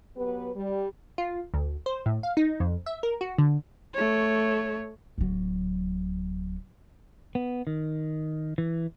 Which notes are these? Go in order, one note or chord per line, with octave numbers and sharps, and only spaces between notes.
F#3 B3 G4 B4
G3
F4
D2
C5
A2
F5
D#4
F2
E5
A#4
F#4
D3
A3 C#5
D1 F#3
B3
D#3
E3